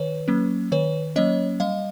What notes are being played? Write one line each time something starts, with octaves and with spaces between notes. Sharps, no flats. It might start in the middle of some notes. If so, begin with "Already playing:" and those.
Already playing: D#3 B4 C#5
F#3 A#3 C#4
D#3 B4 C#5
F#3 A#3 C#4 C#5 D#5
G3 D#5 F5